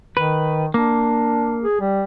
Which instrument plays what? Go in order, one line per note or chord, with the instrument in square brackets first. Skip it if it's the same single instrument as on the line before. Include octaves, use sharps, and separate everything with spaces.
[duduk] D#3 [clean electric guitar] B4
[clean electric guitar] A#3 [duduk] D4
[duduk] G#4
G3